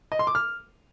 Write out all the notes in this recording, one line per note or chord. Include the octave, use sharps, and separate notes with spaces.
D#5
C6
D6
F6